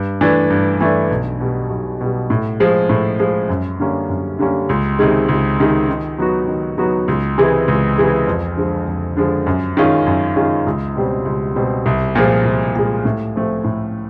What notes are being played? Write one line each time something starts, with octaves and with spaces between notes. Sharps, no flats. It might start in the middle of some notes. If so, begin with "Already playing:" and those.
Already playing: G2
E3 A3 D4
G2
E3 A3 D4
B1
B2 G3
B1
B2 G3
A2
F3 G#3
A2
F3 G#3
F#2
D3 G3 A#3 C#4
F#2
D3 G3 A#3 C#4
C#2
C3 D#3 G#3
C#2
C3 D#3 G#3
D#3
F#3 B3 D#4 F#4
D#3
F#3 B3 D#4 F#4
C#2
C3 E3 G#3
C#2
C3 E3 G#3
F2
D3 F3 G#3
F2
D3 F3 G#3
F#2
D#3 G#3 C#4 F4
F#2
D#3 G#3 C#4 F4
C#2
B2 G3 C4
C#2
B2 G3 C4
C2
A#2 F3 G#3
C2
A#2 F3 G#3
A2
F3 A3 C4
A2